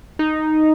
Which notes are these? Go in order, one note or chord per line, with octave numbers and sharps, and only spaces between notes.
D#4